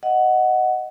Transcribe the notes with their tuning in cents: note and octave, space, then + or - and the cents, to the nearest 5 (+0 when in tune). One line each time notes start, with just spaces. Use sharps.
D#5 +0 F#5 +5